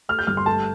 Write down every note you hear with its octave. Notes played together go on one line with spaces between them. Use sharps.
A3 F6
G6
G1 F6
C6
A3 A5